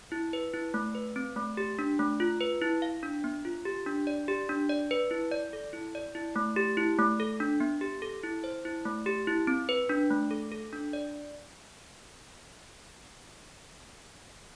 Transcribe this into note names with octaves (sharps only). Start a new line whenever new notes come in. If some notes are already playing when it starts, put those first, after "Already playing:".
E4
B4
E4
A3
B4
C4
A3
G4
D4
A3
F4
B4
E4
F5
D4
B3
F4
G4
D4
D5
G4
D4
D5
B4
E4
D5
A4
E4
D5
E4
A3
G4
E4
A3
A4
D4
B3
G4
A4
E4
C5
E4
A3
G4
E4
C4
B4
D4
A3
A4
A4
D4
D5